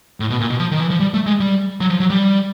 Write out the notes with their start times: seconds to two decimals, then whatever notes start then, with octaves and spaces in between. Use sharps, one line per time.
0.20 A2
0.30 B2
0.40 A#2
0.50 B2
0.60 F3
0.71 D#3
0.80 E3
0.90 F3
1.00 G3
1.14 A3
1.26 G#3
1.40 G3
1.81 F#3
1.90 F3
2.00 F#3
2.10 G3